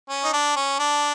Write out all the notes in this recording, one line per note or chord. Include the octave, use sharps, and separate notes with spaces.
C#4
D#4
D4
C#4
D4